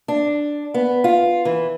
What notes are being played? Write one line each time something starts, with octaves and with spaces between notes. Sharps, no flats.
D4
B3
F4
E3